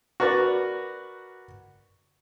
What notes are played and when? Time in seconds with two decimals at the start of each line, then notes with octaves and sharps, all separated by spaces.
0.20 F#4 A#4 B4 D5